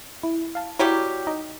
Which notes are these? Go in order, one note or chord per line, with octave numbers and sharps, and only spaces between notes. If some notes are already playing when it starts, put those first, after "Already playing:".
E4
F5 A5
F#3 G3 E4 F#4 G4 B6
D#4 D#5 G5